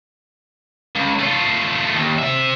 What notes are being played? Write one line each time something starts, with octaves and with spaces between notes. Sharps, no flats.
C#2
A3 F4
D#2
C3 E5